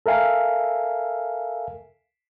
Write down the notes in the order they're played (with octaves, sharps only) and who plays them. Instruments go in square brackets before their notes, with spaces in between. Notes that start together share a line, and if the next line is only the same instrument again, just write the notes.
[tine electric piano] A4 A#4 E5 F5 G#5